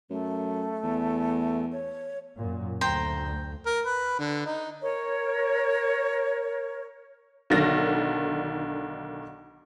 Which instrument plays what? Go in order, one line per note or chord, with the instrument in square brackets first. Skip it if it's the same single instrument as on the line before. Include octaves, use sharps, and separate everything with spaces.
[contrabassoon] F#2 [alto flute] A3
[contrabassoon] E2
[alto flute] C#5
[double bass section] F#2 A#2
[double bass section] D2 [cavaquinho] C5 G5 A#5
[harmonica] A#4
B4
D3
D#4
[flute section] A#4 C#5
[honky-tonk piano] B1 D3 D#3 A#6